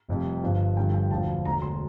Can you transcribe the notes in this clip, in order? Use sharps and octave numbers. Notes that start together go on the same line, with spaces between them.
F1 F2 C3 G3
G1 G2 D3 F3
G1 G2 D3 F3 G5
G5
E1 D2 D3 F3 A5
E1 D2 D3 A#5
C6